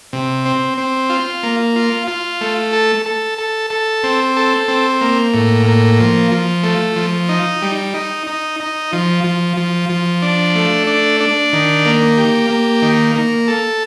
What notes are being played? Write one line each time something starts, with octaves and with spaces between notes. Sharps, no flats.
C3
C4
C4
F4
A#3
F4
F4
A3
A4
A4
A4
A4
C4
A4
C4
A#3
A2
A#3
F3
F3
A3
F3
D#4
G3
D#4
D#4
D#4
F3
F3
F3
F3
D4
A3
D4
D4
D#3
A#3
G4
A#3
D#3
A#3
A4